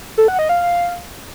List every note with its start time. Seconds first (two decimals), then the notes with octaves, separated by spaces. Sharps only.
0.18 A4
0.28 F#5
0.39 D#5
0.49 F5